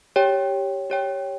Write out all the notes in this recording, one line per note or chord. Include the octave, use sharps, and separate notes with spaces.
G4 C#5 G5
G4 C#5 G5